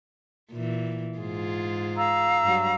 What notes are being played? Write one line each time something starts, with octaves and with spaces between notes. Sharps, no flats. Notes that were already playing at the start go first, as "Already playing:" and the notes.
A#2 E3
G#2 F4 G#4
F5 A#5 E6
G2 F#3